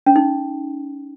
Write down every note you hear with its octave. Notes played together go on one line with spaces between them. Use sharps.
C#4
D#4